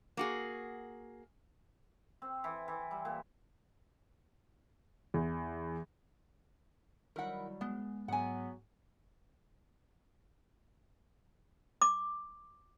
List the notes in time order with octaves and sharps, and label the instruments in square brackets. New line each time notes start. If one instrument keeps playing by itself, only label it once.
[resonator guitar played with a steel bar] A#3 F#4 G#4
[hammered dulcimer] C4
E3
E3
G3
A#2
[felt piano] E2
[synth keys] D#3 E4 B5 [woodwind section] F#3 G3 [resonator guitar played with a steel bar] A#4 F#5
[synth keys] G#3 [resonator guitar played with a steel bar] B3
[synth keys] G#2 [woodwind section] F#3 B3 [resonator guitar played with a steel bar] F#5 G#5
[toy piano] D6